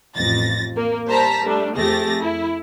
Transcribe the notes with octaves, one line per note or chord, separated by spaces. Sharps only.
A1 F2 A6 A#6
A#3
G3 C5 A5 A#5 B6
G3 A3 D4
F2 A3 G4 G#4 A6 A#6
E4